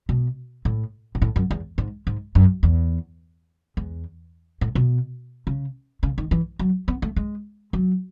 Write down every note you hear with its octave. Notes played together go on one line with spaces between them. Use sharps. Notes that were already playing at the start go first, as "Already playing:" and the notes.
B2
A2
G#2
A2
F#2
E2
G#2
G#2
F#2
E2
E2
A2
B2
C#3
C#3
D#3
E3
F#3
B3
A3
G#3
F#3